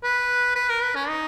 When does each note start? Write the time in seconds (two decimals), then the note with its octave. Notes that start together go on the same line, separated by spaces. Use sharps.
0.03 B4
0.56 B4
0.69 A#4
0.82 B4
0.96 C#4
1.09 D#4